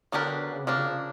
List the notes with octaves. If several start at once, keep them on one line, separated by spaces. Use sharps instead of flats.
D3 F#3 B3 D4 G4 A#4
D3
C#3
C3 F3 A#3 D4
C#3